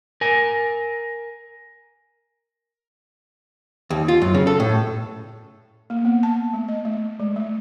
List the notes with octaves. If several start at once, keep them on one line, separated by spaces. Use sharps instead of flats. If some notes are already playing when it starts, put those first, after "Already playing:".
A#4 G#5
D#2
F4
F#2
C#3
A4
A2
A#3
B3
A5
A3
D#5
A3
G#3
A3